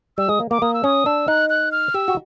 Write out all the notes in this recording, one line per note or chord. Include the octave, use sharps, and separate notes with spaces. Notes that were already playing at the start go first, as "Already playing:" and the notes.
G3 E6
G#3 D#6
A#3
A#3 D6
A#3 D#6
E6
C#4 D#6
D4 E6
D#4 F#6
F#6
F6
G4 E6
F#4